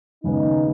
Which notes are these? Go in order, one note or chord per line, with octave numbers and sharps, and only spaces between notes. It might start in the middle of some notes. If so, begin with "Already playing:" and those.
D#2 C#3 G#3 B3 D#4